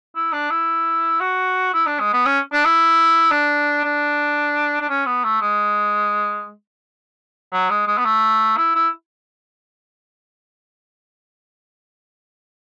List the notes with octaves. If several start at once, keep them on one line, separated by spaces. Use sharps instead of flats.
E4
D4
E4
F#4
E4
D4
G#3
B3
C#4
D4
E4
D4
D4
D4
C#4
B3
A3
G#3
F#3
G#3
G#3
B3
A3
E4
E4